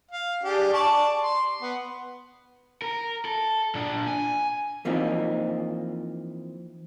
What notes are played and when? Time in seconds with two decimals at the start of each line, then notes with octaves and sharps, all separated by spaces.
0.12 F5
0.43 D4 G4 G#4
0.73 D5 A5 C#6
1.22 C6
1.62 B3
2.82 A#4
3.25 A4
3.75 A#2 D4
4.07 G#5
4.85 E3 F3 A#3 C4 D#4